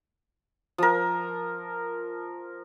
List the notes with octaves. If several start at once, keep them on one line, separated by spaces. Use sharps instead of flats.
F3 A#4